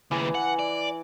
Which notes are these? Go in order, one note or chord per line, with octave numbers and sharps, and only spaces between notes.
D#2 C#3 E3
F#5
D5